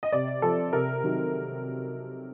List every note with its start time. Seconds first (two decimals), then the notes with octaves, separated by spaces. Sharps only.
0.03 D#5
0.12 C3 D5
0.42 F3 A4
0.73 C3 A#4
1.03 D#3 F#3